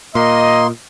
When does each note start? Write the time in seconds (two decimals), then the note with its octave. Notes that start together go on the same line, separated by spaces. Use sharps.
0.15 A#2 A#3 D#5 C6